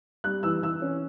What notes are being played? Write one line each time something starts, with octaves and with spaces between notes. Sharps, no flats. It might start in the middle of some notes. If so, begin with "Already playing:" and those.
G3 F#6
E3 E6
E3 E6
C#4